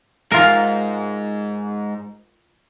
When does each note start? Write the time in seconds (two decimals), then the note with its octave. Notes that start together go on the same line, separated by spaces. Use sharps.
0.31 G#2 F4 A#4